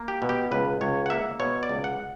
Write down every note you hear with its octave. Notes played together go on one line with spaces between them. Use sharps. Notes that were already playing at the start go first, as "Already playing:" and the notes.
Already playing: A#3
G4
B2
G4
C#2 B4
C#2 C#5
F#5
A#3 E5
B2 C#5
D5
C#2
F#5